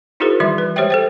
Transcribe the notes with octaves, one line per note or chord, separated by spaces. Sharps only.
D#4 E4 F#4 G#4 A#4 C5
D#3 E3 G3 E5 C6
B4
G#3 G4 C5 C#5 E5 G5
A4 C5 G5